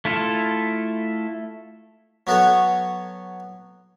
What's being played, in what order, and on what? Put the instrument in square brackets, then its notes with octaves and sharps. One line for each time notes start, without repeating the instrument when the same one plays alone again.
[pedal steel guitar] A3 E4 F4 A4
[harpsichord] F#3 B3 F#4 A4 C#5